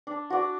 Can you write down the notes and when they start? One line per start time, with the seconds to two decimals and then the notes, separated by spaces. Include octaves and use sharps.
0.07 D4
0.30 F#4 D5